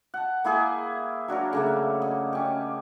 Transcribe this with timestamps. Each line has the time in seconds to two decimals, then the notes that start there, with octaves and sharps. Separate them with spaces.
0.14 F#5 A5
0.44 A#3 E4 G#4 G5
1.28 F#3 D4 F#4 A#4
1.53 C#3 A3 A#3
2.02 D#5
2.33 C#4 G4